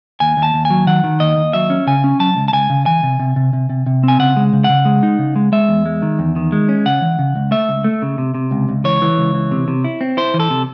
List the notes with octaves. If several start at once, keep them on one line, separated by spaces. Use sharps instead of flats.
D#2 G#5
D#2
A5
D#2
G#5
F#3
D#3 F#5
D#3
D#2 D#5
D#2
F#3 E5
C#4
C#3 G#5
C#4
F#3 A5
C#2
A5
C#2 G#5
C#3
E3 G#5
C3
C3
C3
C3
C3
C3
C4 G#5
C#3 F#5
G#3
C#3
C#3 F#5
G#3
D#4
C#3
G#3
G#3 E5
E2
G#3
D#3
E2
D#3
G#3
C#4
C#3 F#5
E3
C#3
C#2
A3 E5
C#2
A3
C#3
C3
C3
C#2
C#2
E3 C#5
E3
C#2
E3
C3
C3
E4
C4
E4 C5
E3
A4
C3